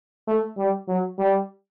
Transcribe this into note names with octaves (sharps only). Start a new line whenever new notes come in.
A3
G3
F#3
G3